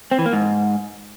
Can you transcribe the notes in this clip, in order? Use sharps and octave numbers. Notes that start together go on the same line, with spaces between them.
C4
E3
A#3
G#2